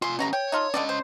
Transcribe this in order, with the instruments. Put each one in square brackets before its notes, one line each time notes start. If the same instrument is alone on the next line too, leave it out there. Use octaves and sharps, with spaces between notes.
[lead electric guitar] F4 G#5 [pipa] C6
[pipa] B2 A#5 B5 [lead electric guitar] C#4 G4
[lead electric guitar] C#5 [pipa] G5
[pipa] D#4 F4 A4
[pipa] D3 A4 D5 [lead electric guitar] C#4 D#5
[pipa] C5